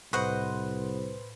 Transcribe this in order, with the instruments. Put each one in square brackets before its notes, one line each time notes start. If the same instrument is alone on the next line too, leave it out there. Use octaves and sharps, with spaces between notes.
[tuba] C2 [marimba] A2 [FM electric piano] B4 C5 [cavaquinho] D#5 F#5